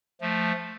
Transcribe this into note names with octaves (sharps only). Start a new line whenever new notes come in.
F3 A3